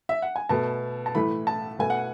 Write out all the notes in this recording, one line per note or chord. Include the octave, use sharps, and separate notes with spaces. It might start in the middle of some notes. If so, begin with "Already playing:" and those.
E5
F#5
G#5
B2 A3 A5
A5
A2 E3 A3 B5
A5
B2 A3 G#5
F#5